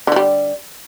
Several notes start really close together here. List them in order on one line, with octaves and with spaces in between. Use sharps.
D3 F3 G3